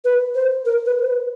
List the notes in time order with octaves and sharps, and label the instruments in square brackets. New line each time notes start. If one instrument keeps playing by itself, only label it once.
[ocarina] B4
C5
A#4
B4
C5
B4